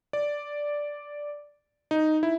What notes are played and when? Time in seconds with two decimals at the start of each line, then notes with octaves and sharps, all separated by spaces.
0.13 D5
1.91 D#4
2.23 E4